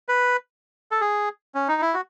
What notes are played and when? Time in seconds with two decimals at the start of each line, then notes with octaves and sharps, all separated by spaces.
0.09 B4
0.91 A4
1.01 G#4
1.55 C#4
1.68 D#4
1.82 E4
1.94 F#4